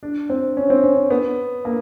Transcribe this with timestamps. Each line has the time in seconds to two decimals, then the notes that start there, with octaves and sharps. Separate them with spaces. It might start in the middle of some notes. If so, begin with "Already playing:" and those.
0.03 D4
0.30 C4
0.57 C#4
0.70 C4
0.83 C#4
1.10 B3
1.65 A#3